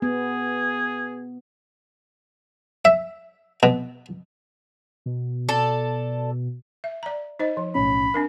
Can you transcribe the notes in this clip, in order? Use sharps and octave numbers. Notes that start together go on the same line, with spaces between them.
B3 G#4
E5
B2
B2
A4 D5
E5
D5 A#5
D#4 C5 D#5
F3
B1 A2 C#4 B5
C4 D4 A#4